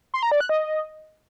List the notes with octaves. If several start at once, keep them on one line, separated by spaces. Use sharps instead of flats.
C6
A#5
D5
F#6
D#5